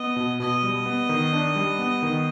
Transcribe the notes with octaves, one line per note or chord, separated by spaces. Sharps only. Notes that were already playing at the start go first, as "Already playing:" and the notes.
Already playing: B3 D#5
B2
B2 D#5
G3
B3
D#3
D4
G3
B3
D#3